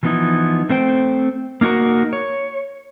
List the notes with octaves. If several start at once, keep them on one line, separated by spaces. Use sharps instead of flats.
E3 F3 B3 C#4 D#4 E4
A3 C4 C5 G5
A#3 D#4 E4 F#4 A#4
C#5